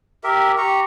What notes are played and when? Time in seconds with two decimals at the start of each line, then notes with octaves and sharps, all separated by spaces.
0.24 G4 A#4 E5
0.58 G4 A#5 C#6